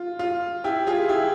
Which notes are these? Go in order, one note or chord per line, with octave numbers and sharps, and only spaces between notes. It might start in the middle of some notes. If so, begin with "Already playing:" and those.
Already playing: F4
F4
E4 G4
F4 G#4
E4 G4